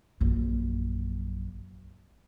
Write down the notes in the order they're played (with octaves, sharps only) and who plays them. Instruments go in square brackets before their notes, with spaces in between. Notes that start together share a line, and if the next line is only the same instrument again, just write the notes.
[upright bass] A#1 F#2